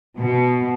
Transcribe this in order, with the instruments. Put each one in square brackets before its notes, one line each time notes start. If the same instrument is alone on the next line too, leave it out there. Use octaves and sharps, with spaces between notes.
[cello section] B2